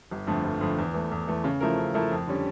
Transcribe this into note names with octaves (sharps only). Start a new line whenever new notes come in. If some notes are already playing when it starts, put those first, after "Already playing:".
G1
F2 D3 A3
G1
F2 D3 A3
E2
E3 A3
E2
E3 A3
C#3
F3 A3 E4 A#4
C#3
F3 A3 E4 A#4
F2
D3 G3 C#4